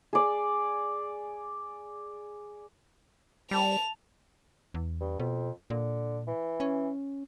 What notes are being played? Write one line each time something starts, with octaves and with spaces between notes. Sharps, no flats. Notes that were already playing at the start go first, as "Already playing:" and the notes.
G#4 D5
G3 A5 F7
E2
G2
F2 B2
A#2 D3
E3
C#4